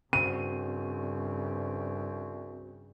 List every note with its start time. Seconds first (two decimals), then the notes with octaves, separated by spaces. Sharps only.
0.13 C2 G2 C#3 C4 F#4 D#7